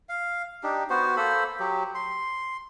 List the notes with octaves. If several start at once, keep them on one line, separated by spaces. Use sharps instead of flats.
F5
D4 D#4 G4
B3 F#4 C5
A#3 A4 C5 B5
F#3 G4
C6